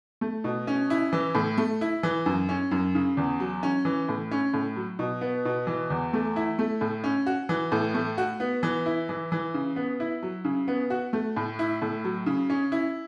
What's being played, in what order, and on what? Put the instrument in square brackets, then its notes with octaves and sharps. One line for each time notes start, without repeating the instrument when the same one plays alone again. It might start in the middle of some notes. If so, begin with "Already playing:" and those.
[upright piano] A3
B2
C#4
E4
E3
A2
A3
E4
E3
F#2
C#4
F#2
C#3
E2
F#3
C#4
E3
A2
C#4
A2
F#3
B2
B3
B2
E3
E2
A3
E4
A3
A2
C#4
F#4
E3
A2
A3
F#4
B3
E3
E4
E3
E3
C#3
B3
E4
F#3
C#3
B3
F#4
A3
A2
E4
A2
F#3
C#3
C#4
E4